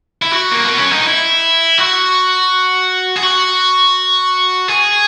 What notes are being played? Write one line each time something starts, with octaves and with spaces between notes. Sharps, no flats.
E4
F#4
A#3
B3
C#4
D#4
E4
F#4
G#4
F#4
G#4